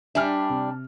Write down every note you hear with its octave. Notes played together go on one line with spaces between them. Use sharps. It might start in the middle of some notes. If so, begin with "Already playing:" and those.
G3 D4 E5 G#5 F6
C3